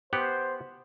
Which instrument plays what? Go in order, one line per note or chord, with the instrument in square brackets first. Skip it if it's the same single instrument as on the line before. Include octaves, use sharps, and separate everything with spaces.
[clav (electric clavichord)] B3 G4 F#5 [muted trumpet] C5